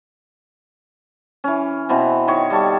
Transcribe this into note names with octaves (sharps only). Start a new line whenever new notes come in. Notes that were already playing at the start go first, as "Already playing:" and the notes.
E3 C#4
B2 E3 C4
D#3 C#5
G3 A4 C#5